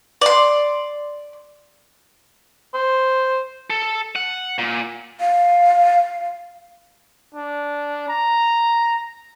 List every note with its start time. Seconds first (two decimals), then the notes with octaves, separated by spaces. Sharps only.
0.21 D5 C6
2.74 C5
3.70 A4
4.16 F#5
4.58 A#2
5.20 F5
7.34 D4
8.08 A#5